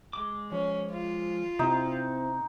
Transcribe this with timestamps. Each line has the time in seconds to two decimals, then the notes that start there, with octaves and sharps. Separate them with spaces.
0.13 G#3 D6
0.52 F3 C#4
0.92 F4
1.59 C3 C4 D#4 E4